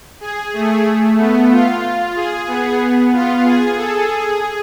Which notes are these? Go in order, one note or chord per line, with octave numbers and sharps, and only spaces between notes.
G#4
A3
B3
F4
G#4
B3
F4
G#4
A4
G#4